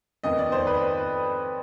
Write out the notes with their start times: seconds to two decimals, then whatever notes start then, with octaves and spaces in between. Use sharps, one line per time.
0.24 F2 D#3 B3 D#5
0.39 D5
0.52 C5
0.67 B4